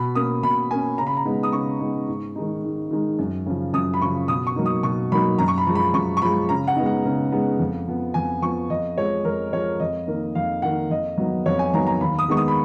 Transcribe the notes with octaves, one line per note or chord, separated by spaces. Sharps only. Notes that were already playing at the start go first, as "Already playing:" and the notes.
Already playing: B2 B5
A#3 C#4 D#6
B2 B5
A#3 C#4 G#5
C#3 A#5
B5
A#5
G#3 B3 D#4
D#6
C#3 C#6
G#3 B3 D#4
G#2
D#3 G#3 D#4
G#2
D#3 G#3 D#4
F#2
C#3 F3
F#2 D#6
B5
C#3 F3 C#6
B2 D#6
C#6
F#3 A#3 D#4
D#6
B2 C#6
F#3 A#3 D#4 B5
F#2 A#5
C#6
B5
F3 G#3
B5
F#2 C#6
C#6
F3 G#3 B5
C#3 A#5
F#5
G#3 B3 D#4
F#5
C#3
G#3 B3 D#4
F2
F3 B3
F2 G#5
F3 B3 C#6
F2 D#5
F3 G#3 C#5
F2 A#4
F3 G#3 C#5
F2 D#5
D#3 A#3
F2 F5
D#3 A#3 F#5
F2 D#5
D#3 F#3 B3 D#4
F2 C#5
G#5
D#3 F#3 B3 D#4 A#5
A#5
D#2 B5
D#6
D#3 G#3 B3 D#4 C#6
D#6
B5